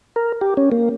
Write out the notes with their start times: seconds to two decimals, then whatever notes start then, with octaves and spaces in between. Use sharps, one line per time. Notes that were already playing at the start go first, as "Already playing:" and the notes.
0.16 A#4
0.41 G4
0.57 C#4
0.72 A#3